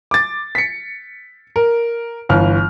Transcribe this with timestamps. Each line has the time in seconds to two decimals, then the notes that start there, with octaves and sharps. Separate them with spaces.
0.11 D6 A6
0.55 B6 C#7
1.56 A#4
2.29 G1 E3 F6